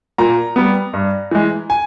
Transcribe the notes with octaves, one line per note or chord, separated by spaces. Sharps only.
A#2 A#5
G3 B3
G2
E3 G#3
G#5